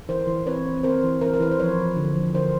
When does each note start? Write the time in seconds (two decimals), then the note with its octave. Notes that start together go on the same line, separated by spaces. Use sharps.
0.09 E3 A#4 C5
0.27 E3
0.46 C4 B4 C#5
0.66 C4
0.84 C4 A#4 C5
1.04 E3
1.21 E3 A#4 C5
1.34 A#4
1.40 E3 B4
1.51 C5
1.59 F3 B4 C#5
1.79 F3
1.97 D3
2.16 F3
2.35 D3 A#4 C5